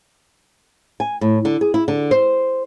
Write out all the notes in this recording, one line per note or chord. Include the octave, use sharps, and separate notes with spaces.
G#5
A2
D3
G#4
E4
D3
C5